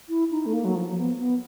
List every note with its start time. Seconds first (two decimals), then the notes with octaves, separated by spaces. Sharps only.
0.09 E4
0.31 D#4
0.46 A3
0.53 A#3
0.65 F#3
0.76 F3
0.98 B3
1.19 B3